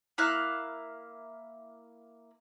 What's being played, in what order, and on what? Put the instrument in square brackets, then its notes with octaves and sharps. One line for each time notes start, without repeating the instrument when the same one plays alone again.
[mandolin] A#3 E4 F5 F#6